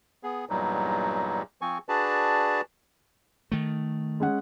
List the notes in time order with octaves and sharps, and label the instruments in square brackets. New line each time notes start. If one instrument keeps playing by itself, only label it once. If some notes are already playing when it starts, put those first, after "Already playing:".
[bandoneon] B3 G#4
E2 G2 A#2 F#3 G3 D#4
F3 C4 G#5 C#6
D4 F#4 G#4 B4 D5 A5
[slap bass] D#3 A3
[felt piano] G#3 C#4 F#5